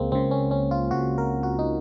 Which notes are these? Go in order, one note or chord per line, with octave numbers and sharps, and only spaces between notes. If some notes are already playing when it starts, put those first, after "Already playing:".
Already playing: C#2 C#3 G#3 A#3 C4
C#2 C#3 C4
C#4
C#4
F4
C#2 C#3 F#4
A#4
F#4
D#4